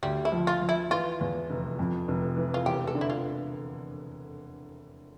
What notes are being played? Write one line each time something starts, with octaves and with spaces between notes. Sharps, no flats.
D2 G3
E4
F3
F4
F3
E4
E3 F4
E2
F1
F2
F1
E3
F4
E1 G4
A4
D3
E4
F4